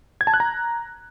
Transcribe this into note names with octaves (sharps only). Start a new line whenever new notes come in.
G#6
A5
F#6
A#5